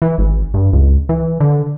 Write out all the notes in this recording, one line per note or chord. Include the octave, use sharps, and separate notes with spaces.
E3
G#1
G2
C#2
E3
D3